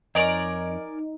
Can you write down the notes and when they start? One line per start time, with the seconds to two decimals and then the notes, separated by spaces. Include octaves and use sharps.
0.15 F2 D#4 A#4 C#5 D5 G#5